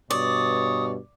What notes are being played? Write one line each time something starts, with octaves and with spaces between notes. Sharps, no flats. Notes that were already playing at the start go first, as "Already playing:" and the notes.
G2 B2 C#5 D5 D#6